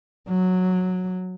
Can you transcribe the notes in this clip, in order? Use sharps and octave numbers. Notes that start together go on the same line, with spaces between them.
F#3